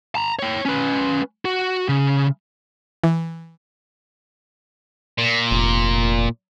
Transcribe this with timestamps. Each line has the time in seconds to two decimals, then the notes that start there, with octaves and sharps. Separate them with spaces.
0.15 A5 A#5
0.39 C#5 G5
0.65 C#4 B4
1.45 F#4
1.89 C#3
3.04 E3
5.18 A#2
5.51 F1